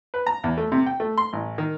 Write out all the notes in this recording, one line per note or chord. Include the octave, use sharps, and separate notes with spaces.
B4
A#5
E2
A3
C3
G5
A3
C6
A1
D#3